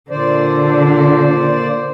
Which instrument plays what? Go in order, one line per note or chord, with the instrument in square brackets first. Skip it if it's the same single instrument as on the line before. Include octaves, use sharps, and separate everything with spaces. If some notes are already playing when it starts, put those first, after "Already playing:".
[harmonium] A#2 C5 D5 [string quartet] D3